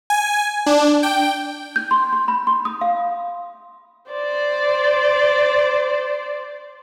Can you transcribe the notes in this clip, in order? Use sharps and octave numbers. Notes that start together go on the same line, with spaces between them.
G#5
D4
G5
G6
C6
C6
B5
C6
D#6
F5
C5 D5